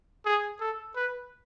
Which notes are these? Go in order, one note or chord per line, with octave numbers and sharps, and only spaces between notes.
G#4
A4
B4